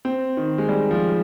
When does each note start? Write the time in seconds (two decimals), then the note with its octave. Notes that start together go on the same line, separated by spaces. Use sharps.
0.05 C4
0.37 D#3
0.58 G#3
0.69 G3
0.91 F3